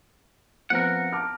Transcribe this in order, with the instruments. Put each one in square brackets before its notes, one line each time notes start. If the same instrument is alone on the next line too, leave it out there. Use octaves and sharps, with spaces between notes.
[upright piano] F3 B3 C4 [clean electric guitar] A#4 F#5
[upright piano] A5 D6 F6